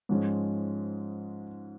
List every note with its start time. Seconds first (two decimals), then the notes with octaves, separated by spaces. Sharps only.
0.09 G#2 F3 G#3 C#4